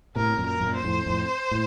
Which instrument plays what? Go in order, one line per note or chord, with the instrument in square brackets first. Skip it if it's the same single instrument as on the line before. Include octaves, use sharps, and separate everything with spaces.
[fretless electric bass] A2 C3 [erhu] A#4
[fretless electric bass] C3
F#2 A#2
[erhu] A#4
[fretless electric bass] F#2 A#2
[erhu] C5
[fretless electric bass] F2 A2
F2 A2
A2